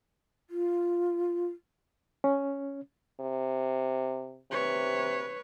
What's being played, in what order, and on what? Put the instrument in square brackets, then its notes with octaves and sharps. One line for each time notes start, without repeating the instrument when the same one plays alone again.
[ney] F4
[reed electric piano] C#4
[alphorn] C3
[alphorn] C3 [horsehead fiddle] B4 C#5